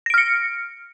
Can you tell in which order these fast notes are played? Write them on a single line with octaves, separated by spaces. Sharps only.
A#6 D7 F6 C#7